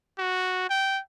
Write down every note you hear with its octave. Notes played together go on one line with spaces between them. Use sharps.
F#4
G5